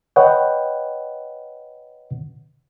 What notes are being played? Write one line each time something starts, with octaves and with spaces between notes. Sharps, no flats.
B4 C#5 D#5 F#5 G5